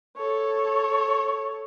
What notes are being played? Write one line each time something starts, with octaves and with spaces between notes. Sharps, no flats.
A4 C#5